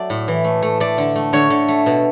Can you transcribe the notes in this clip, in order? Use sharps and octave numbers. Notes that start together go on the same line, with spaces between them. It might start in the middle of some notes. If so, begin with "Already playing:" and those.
Already playing: F#3 A3 D5
A2
E3
A3
A3
A3 D5
D3
A3
D3 C#5
D3
A3
B2